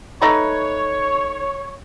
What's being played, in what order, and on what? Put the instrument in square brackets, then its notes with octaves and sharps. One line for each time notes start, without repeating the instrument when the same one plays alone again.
[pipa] A3 D#4 B4 [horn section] C#5